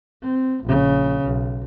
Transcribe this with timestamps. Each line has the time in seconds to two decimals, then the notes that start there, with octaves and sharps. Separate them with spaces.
0.22 C4
0.64 A#1 C#3
1.24 B1